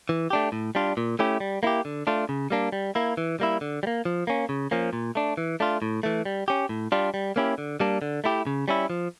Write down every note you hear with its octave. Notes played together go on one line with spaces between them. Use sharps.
E3
A3 D4 G4
A2
G3 D4 F4
A#2
A3 C#4 E4 G4
G3
A#3 E4 G4
D3
A3 D4 F4
C#3
G3 A#3 D4
G3
A#3 E4
E3
G3 A#3 E4
D3
G3
A#3
F3
A#3 C#4
C#3
F3 A#3 C#4
A#2
A3 D4
E3
A3 D4 F4
A2
E3 A3
G3
C#4 G4
A2
G3 D4 F4
G3
A#3 C#4 E4 G4
D3
G3 A#3 D4
D3
A3 E4 G4
C#3
G3 C#4 E4
F3